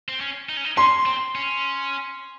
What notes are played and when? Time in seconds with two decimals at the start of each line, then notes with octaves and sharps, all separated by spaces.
0.08 C4
0.21 C#4
0.49 D#4
0.57 C#4
0.65 D#4
0.77 C#4 C6
1.06 C4
1.35 C#4